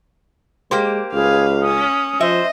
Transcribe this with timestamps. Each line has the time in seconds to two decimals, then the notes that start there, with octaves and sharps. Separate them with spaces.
0.71 G#3 A#3 G4 C5
1.13 C#2 G#4 B4 F5
1.61 C#4 D#6
2.21 F3 C5 D#5 E5